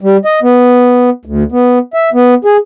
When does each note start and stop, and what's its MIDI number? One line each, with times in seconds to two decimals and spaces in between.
0.01 0.17 55
0.25 0.40 75
0.43 1.10 59
1.25 1.43 38
1.52 1.79 59
1.94 2.10 76
2.14 2.34 59
2.45 2.57 68